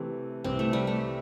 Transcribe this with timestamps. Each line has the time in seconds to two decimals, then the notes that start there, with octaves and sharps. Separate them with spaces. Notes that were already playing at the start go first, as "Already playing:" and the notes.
Already playing: C3 E3 A3 C4
0.44 C2 C3 E3 C4
0.59 A3
0.73 G3
0.87 A3